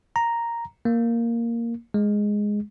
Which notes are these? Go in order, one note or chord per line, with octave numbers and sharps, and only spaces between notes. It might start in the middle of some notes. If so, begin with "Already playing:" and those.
A#5
A#3
G#3